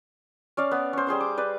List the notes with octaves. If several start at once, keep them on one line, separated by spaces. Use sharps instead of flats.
C#4 D5 F5
B3
C#4 C5
G3 G#4 C5 C6
D6
B4 D5